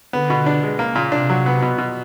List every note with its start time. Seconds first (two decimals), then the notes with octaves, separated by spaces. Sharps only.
0.13 D3 B3
0.30 B2
0.46 D4
0.63 G#3
0.79 C#3 A#3
0.95 A#2
1.12 C3 D4
1.30 F#3
1.46 B3
1.62 B2
1.78 B2